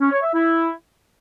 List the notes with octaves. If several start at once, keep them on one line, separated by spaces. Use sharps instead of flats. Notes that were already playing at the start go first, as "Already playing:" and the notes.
C#4
C#5
E5
E4